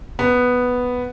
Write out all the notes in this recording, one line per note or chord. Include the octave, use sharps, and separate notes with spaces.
B3